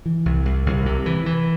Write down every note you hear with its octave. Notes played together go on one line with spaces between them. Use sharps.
E3
C2
C2
C2
C3
E3
E3